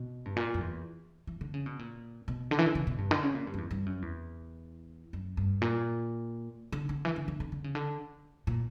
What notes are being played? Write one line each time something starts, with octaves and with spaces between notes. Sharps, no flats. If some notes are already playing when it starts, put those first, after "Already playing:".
Already playing: B2
G2
A#2
F#2
E2
E3
D3
C#3
B2
A#2
B2
D3
E3
D3
C#3
B2
G2
D3
C#3
A#2
G2
F#2
E2
G2
F#2
E2
F#2
G2
A#2
D3
D3
E3
D3
D3
D3
D3
C#3
D3
A#2